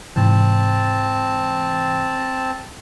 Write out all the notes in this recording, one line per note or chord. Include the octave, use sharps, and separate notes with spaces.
G#2 C3 E3 C4 A5